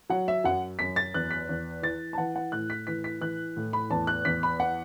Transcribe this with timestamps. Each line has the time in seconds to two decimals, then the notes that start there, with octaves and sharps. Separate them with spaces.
0.10 F#3 F#5
0.28 E5
0.44 F#2 F#5
0.79 F#2 B6
0.96 A6
1.14 E2 F#6
1.31 B6
1.49 E2
1.82 E3 A6
2.13 A5
2.18 E3 F#5
2.36 F#5
2.52 A2 F#6
2.70 B6
2.87 E3 B6
3.04 B6
3.21 E3 F#6
3.57 A2
3.73 B5
3.90 E2 A5
4.07 F#6
4.25 E2 B6
4.43 B5
4.60 F#5